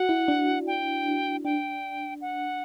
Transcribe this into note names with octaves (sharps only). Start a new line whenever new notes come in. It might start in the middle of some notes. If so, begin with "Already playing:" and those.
Already playing: F#4 F#5
E4
D4
G5
D4 G5
F#5